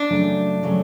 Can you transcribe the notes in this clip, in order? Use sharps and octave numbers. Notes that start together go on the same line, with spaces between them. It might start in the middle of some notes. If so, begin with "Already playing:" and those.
Already playing: D4
F#2 C#3 F#3 A3
C#3 F#3 A3